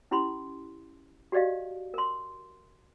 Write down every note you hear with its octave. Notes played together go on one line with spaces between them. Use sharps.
C#4 E4 G4 B5 C6
F#4 G4 D5 D#5 F5
A#4 C6